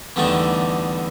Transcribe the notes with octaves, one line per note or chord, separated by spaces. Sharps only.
E2 D3 E3 G3 A3 D#4